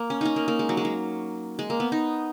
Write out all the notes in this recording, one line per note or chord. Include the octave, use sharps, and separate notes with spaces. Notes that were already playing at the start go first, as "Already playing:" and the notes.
Already playing: A#3
C#4
C#4 D#4
A#3
A#3
G#3
F#3
G#3
F#3
G#3
A#3
B3
D#4